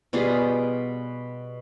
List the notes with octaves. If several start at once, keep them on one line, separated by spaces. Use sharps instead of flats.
B2 G3 F4 G#4